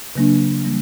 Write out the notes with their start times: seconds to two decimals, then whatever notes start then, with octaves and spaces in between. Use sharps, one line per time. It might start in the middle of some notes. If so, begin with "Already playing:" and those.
0.15 C#3 F#3 A#3 D4
0.65 E3 G3 A#3